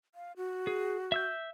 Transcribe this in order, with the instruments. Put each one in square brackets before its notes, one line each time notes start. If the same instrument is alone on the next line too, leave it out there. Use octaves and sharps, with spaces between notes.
[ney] F5
F#4
[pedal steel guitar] G#4
E5 E6 G6